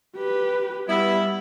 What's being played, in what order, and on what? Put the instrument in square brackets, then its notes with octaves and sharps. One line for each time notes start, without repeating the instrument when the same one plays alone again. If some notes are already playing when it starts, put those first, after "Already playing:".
[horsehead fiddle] G4 B4
[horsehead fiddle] G3 [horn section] B3 E4